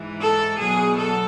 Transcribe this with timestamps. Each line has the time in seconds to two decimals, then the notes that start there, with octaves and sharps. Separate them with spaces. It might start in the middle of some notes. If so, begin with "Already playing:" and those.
Already playing: G#2 E3
0.20 A4
0.60 E2 B2 F#3 G#4
0.98 A4